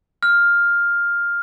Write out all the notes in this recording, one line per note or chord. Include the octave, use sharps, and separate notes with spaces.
F6